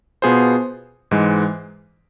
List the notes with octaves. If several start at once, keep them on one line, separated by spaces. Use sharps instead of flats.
B2 B3 F4 G#4 C5
G#2 E3 G#3